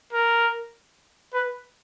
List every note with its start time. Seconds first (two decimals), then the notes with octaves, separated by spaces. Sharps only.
0.13 A#4
1.34 B4